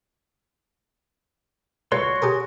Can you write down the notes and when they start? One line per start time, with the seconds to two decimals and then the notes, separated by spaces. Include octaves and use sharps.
1.92 C#2 F#4 B4 C#5 C6
2.22 G4 G#4 A#4